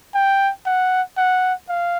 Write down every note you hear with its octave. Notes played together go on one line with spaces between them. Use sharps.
G5
F#5
F#5
F5